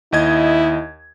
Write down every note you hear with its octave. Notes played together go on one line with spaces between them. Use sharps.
D#2 E4 D#5 G#6